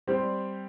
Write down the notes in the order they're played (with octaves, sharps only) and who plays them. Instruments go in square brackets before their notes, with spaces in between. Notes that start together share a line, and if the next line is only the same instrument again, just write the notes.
[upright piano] G3 C4 G4 C5